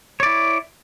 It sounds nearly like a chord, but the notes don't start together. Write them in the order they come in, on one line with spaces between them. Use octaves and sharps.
C#5 D5 E4